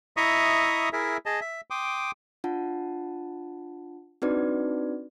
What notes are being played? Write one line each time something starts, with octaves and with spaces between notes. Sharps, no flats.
E4 D#5 E5 A#5 C#6 D#6
E4 G#4 A#4 E5
G#4 D#5 A5
E5
G5 C6 D6 D#6
D4 F4 F#5 A5
C4 D4 D#4 F#4 B4 D5